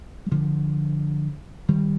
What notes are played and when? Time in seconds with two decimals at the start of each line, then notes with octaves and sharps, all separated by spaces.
0.26 G3
0.32 D3 F3
1.69 D#3 G3